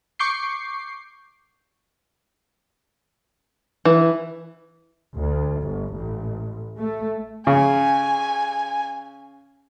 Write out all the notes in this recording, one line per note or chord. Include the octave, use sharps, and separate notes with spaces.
C#6 D6 G6 C7
E3
D2
G1
A1
A3
C#3 G#5